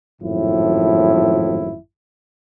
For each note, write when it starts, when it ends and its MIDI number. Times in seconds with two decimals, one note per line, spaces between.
0.22 1.77 32
0.22 1.77 42
0.22 1.77 45
0.22 1.77 53
0.22 1.77 64